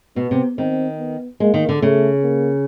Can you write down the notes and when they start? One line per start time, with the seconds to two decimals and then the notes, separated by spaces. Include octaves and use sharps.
0.16 B2 B3
0.31 C3
0.58 D#3 C4
0.99 B3
1.40 G#3 A#3
1.54 D#3
1.69 D3
1.82 C#3 A3
2.23 A#3